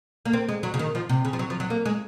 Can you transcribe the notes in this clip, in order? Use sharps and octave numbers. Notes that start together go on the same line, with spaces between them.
A#3
C4
G#3
F#3
C#3
D#3
F3
C3
C#3
F3
F#3
F3
F#3
A#3
G#3